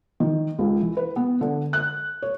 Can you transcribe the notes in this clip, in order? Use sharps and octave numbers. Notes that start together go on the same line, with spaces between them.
D#3
C#2
E3
B4
B3
D3
F#6
C#5